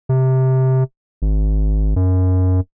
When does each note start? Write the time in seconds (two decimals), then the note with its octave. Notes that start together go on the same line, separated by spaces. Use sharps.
0.09 C3
1.22 G#1
1.96 F#2